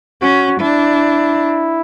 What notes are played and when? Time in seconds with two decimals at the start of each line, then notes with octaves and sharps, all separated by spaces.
0.22 C#4 F#4
0.60 D4 E4